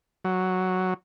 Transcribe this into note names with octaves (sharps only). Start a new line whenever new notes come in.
F#3